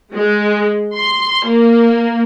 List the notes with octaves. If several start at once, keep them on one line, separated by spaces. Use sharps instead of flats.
G#3
C6
A#3